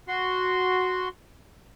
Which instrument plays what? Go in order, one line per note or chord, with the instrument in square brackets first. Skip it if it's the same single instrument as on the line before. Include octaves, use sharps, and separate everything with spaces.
[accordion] F#4 C6